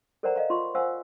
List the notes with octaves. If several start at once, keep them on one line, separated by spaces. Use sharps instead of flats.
A4 A#4 C5 D5 F#5 A#5
D#5 F5 A#5
F4 C6 C#6
C5 F5 F#5 G#5 E6